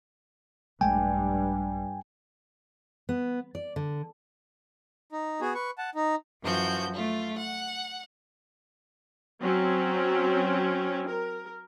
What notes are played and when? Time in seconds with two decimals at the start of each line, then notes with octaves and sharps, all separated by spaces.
0.81 A#1 G2 G#3 A3 G5 G#5
3.09 B3
3.55 D5
3.76 D3
5.12 D#4
5.41 B3 F#4 G#4
5.55 B4 C#6
5.78 F#5 A5
5.95 D#4
6.42 F#2 E3 F3 F#4 G6
6.94 A3 F4
7.37 F#5
9.41 F#3 C4 C#4
11.08 A#4